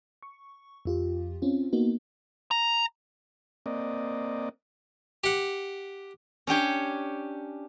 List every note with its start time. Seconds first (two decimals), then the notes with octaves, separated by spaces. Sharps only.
0.23 C#6
0.85 F2 F4 G4
1.42 C4 C#4 F4
1.73 A#3 B3 D#4 F#4
2.51 A#5
3.66 A#3 C4 D5 D#5
5.24 G4 F#5
6.47 C#4 D4 G4 C#5